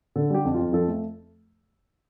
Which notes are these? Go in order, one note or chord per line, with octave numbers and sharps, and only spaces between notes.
D3 A4
G3 G4
F2
F4
F2
F3 A4
A3